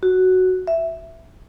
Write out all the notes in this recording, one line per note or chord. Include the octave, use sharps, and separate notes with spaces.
F#4
E5